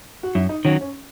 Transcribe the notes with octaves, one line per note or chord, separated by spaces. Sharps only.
F#4
F#2 E4
D#4
D#3 F#3 C#4
C#4